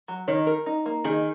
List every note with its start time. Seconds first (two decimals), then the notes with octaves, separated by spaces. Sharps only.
0.08 F#3
0.28 D#3 C#5
0.47 A#4
0.66 D#4
0.86 A#3
1.04 D#3 G#4